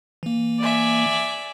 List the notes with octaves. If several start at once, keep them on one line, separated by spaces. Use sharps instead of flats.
E3 A#3
D5 E5 G#5